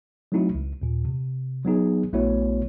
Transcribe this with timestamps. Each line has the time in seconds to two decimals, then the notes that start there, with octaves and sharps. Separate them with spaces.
0.32 F#3 A3 C4 D#4 E4 F#4
0.54 C#2
0.82 D#2 A#2
1.05 C3
1.65 F#3 B3 D#4 G#4
2.13 A#1 A3 B3 E4 F#4 C#5